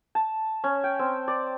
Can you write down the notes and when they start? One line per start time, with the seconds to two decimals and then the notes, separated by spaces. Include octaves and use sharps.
0.15 A5
0.64 C#4
0.84 G5
0.99 C4
1.28 D5